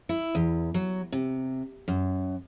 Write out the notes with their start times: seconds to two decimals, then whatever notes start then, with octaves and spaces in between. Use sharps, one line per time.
0.09 E4
0.35 E2
0.74 F#3
1.12 C3
1.88 F#2